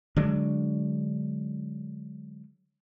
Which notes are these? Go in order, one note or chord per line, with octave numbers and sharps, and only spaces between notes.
D3 F#3 G#3 D4